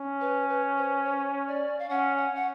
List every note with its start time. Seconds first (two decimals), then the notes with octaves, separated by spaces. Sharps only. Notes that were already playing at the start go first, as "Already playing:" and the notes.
Already playing: C#4
0.21 B4
0.49 B4
0.77 C5
1.05 C#5
1.47 D5
1.79 F5
1.89 C#4 F#5
2.17 F#5
2.35 F#5